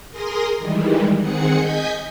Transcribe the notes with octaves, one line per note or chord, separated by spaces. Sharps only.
G#4 A#4 C6 D#6 A#6
D#3 E3 G3 G#3
D#3 C4 G#4 F#5 C#7
D#5 G#5 G6 G#6 B6